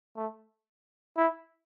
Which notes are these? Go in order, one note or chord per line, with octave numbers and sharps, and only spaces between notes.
A3
E4